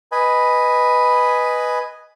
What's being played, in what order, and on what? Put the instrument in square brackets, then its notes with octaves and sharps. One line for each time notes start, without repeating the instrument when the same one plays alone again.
[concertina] B4 D#5 G#5 B5